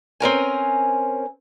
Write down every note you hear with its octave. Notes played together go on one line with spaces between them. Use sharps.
C4 C#4 A#4 G#5